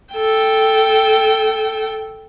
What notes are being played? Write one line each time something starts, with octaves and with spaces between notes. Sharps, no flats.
A4 G5